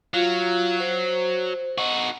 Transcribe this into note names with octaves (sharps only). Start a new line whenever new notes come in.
F#3 F4 F5
C5
D#4 F#4